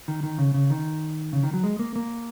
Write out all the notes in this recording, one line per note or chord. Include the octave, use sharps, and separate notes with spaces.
D#3
D#3
C#3
C#3
D#3
C#3
D#3
F#3
G#3
A#3
A#3